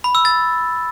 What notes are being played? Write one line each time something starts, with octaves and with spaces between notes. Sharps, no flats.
B5
E6
A6